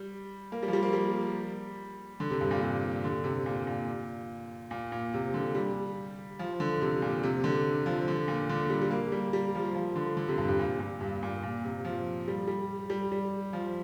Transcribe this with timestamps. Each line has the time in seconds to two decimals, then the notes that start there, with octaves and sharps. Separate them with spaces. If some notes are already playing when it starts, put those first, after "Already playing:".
Already playing: G3
0.52 A#3
0.63 G3
0.68 F3
0.73 G3
0.82 A#3
0.93 G3
2.20 D3
2.30 C3
2.41 G2
2.51 A#2
2.61 C3
3.04 D3
3.24 C3
3.46 A#2
3.67 A#2
4.71 A#2
4.92 A#2
5.14 C3
5.34 D3
5.55 G3
6.39 F3
6.60 D3
6.81 C3
7.02 A#2
7.23 C3
7.44 D3
7.86 F3
8.08 D3
8.28 A#2
8.49 D3
8.70 G3
8.82 G3
8.91 A#3
9.12 G3
9.33 G3
9.55 F3
9.75 F3
9.96 D3
10.17 D3
10.28 C3
10.38 G2
10.49 G2
10.59 A#2
10.80 A#2
11.01 G2
11.23 A#2
11.43 A#2
11.64 C3
11.85 F3
12.28 G3
12.47 G3
12.90 G3
13.12 G3
13.53 F3